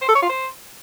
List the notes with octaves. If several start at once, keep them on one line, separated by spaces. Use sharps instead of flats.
C5
A4
C#5
F4
C5